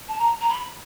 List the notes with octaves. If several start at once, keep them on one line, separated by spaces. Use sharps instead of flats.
A5
A#5
A#5
B5